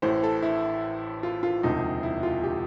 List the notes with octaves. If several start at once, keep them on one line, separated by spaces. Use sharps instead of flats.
A1 A2 E3 C5
A4
E4
F4
F4
E1 D2 C3 F3 D#4
E4
F4
G4